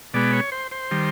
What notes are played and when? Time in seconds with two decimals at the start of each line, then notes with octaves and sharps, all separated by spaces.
0.14 B2 G#3 B3 D5
0.33 C#5
0.52 C5
0.71 C5
0.91 D#3 G3